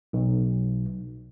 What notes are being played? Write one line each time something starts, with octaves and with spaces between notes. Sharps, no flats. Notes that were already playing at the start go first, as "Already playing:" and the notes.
B1